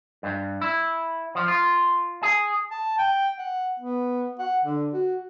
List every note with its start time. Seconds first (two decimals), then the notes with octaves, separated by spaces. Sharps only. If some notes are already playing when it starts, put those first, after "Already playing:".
0.23 G2
0.62 E4
1.35 F3
1.48 F4
2.23 G#4
2.71 A5
2.98 G5
3.39 F#5
3.79 B3
4.39 F#5
4.64 D3
4.93 F#4